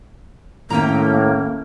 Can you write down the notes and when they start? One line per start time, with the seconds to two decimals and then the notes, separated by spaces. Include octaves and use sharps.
0.70 A2 D#3 A3 A#3 C4 C#4 G5 A#5